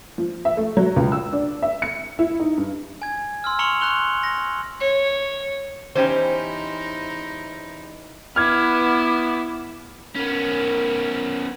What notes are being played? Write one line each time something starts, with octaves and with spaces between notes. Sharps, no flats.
F3
E5
A3
F#3
C#2
E6
D4
E5
C#7
E4
D#4
G2
G#5 G#6
C6 E6 F6
A#5 C6 C#6 C#7 F7 F#7
A#5 C#6 F#6 F7 G7
A#6
C#5
E2 C#4 D#4 E4 G4 C5
B3 E4 D6 F6 G#6
B3 C#4 A#4 B5